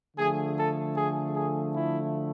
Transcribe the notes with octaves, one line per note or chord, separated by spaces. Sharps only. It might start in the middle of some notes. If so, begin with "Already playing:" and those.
D3 F3 A3 G#4
A4
G#4
G#4
E4